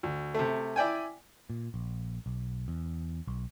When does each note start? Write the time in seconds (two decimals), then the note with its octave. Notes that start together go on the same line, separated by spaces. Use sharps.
0.03 D2
0.34 C3 A3
0.76 E4 D5 G5 G#5
1.50 A#2
1.74 A#1
2.26 B1
2.68 E2
3.28 B1